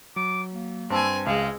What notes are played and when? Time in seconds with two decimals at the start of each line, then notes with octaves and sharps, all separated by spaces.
0.16 F#3 D6
0.53 A#3
0.90 G2 C4 G#5 A5 E6
1.26 C#2 G#3 F5